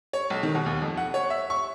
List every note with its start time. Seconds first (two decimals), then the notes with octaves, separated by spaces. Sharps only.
0.13 C#5
0.30 B1
0.43 D#3
0.55 B2
0.66 D#2
0.82 F2
0.97 F#5
1.14 C#5
1.30 E5
1.50 C#6